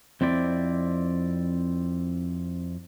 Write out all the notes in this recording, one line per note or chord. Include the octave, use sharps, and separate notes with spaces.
F2 C4 E4 D5